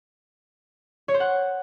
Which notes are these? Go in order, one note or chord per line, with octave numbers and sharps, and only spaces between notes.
C#5
C5
F#5